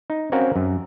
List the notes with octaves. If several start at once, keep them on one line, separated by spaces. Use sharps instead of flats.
D#4
C4 C#4 F#4 A#4 F5 F#5
F#2